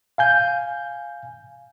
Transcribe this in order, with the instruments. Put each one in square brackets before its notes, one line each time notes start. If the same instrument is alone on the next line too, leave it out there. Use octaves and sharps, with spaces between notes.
[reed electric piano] F5 G#5 G6